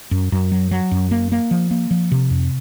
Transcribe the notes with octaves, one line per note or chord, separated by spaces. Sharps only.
F#2
F#2
F#3
F#3
F#2
A#3
A#3
F3
A#3
F3
C3
F2